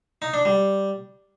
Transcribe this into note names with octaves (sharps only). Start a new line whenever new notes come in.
D#4
D4
G3